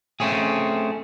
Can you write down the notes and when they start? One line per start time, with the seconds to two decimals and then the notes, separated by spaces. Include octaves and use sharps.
0.20 A3 C4 C#4 G#4